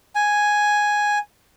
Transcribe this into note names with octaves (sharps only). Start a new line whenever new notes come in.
G#5